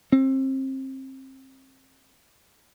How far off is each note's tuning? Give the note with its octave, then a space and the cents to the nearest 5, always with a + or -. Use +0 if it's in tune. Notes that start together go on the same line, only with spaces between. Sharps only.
C4 +30